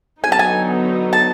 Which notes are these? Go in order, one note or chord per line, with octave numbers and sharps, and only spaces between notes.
D3 F#3 B3 D#4 G#5
A5
G#5
A5